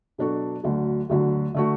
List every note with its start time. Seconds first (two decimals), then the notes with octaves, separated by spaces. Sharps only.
0.18 B2 F#3 D4 F#4 A4
0.64 D2 D3 F#3
1.09 D2 D3 F#3
1.54 D3 A3 F#4